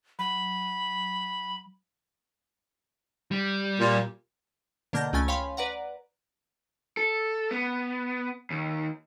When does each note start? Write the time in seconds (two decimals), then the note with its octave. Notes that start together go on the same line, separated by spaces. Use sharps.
0.19 F#3 B5
3.31 G3
3.79 A#2
4.93 B2 D3 A#3 F6 G6 A#6
5.13 C#2 A3 C#4 G#5 A6
5.28 C#5 F5 G5 G#5 B5 C6
5.57 B4 D5 F#5 A#5
6.97 A4
7.51 B3
8.51 D#2